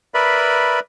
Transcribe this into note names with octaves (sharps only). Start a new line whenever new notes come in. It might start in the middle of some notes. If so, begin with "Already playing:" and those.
A#4 B4 D5 E5 B5